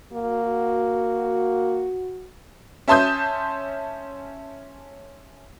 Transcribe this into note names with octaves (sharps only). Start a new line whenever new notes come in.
A#3 F#4
C#4 E5 A5 C6 D#6 G6